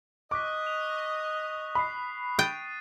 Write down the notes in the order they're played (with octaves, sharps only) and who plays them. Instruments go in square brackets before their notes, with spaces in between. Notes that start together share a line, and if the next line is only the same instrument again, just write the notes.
[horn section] D#5 [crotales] C#6 F#6 B6 [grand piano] D6
[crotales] F7
[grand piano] B5 [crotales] D#6 C7
[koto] G5 [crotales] A6 D#7